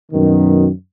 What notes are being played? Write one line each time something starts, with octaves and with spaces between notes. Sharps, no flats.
F#2 B2 D#3